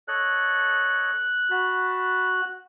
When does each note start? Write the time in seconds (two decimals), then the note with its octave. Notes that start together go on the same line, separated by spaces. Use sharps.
0.08 A4 C#5 D#5 F#6
1.51 F#4 A5 B5